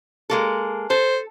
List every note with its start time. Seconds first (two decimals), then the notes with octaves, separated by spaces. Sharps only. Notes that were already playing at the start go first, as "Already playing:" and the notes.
0.30 G#3 A#3 A4
0.90 A4 C5